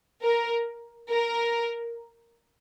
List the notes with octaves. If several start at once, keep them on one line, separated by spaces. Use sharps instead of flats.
A#4
A#4